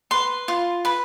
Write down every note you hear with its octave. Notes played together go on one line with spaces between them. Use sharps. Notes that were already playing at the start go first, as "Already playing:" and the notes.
B4 C6
F4
B4 B5